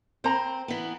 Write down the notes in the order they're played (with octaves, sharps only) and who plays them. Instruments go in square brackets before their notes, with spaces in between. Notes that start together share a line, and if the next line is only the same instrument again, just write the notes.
[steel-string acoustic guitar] C4 [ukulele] C5 A#5 B5
[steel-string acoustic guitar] E3 B3